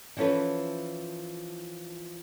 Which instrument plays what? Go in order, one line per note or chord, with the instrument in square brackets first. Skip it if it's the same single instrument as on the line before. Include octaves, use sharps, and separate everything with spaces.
[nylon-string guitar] E3 F3 C#4 A4 B4